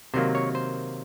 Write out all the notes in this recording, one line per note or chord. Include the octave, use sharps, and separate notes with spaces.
C3 D#3 F#3 A#3 C5
C#5
C5